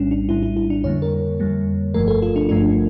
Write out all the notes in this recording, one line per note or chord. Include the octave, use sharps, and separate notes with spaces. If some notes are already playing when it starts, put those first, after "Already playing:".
Already playing: A#1 A2 G3 C#4 D4
D4
A#1 A2 G3 E4
E4
E4
D4
F2 D3 G3 A#3 C#5
A#4
F2 D3 G3 A#3
G1 G2 F3 A3 A#4
A4
F4
D4
G1 G2 F3 A3 D4